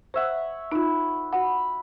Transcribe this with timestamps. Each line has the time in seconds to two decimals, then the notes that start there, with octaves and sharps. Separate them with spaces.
0.14 C5 C#5 E5 F#5
0.72 D#4 F4 B4
1.33 F#4 F#5 B5